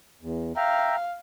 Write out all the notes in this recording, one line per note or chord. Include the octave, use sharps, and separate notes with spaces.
E2
E5 F5 G5 A#5